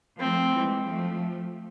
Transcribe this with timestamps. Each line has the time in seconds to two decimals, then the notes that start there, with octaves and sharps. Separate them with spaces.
0.19 F3 A3 C4
0.53 E3 G#3
0.86 F3 A3